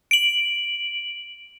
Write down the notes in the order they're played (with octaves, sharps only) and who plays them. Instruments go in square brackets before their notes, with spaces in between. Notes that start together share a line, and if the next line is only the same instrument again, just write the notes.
[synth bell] D7 F#7